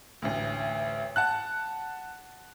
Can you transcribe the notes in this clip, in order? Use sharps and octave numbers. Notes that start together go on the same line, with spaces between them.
A1 D2
F#5 A5 F#6